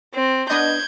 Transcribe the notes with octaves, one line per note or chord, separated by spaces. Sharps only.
C4
B3 D4 D#5 G6 G#6